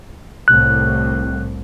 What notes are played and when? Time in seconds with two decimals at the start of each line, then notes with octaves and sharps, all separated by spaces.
0.48 C2 A2 F#6